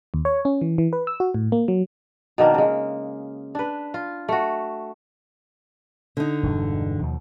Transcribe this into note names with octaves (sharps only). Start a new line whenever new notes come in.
D#2
C#5
C#4
E3
E3
B4
E6
F#4
A2
A#3
F#3
B2 D#3 A#3 D4
C#3 G#3
D4 B4
F4
A3 F#4
D3 D#4
E1 G2
D#2 B2 F3